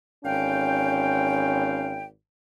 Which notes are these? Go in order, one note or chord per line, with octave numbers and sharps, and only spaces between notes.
G#1 D3 C#4 F5 G5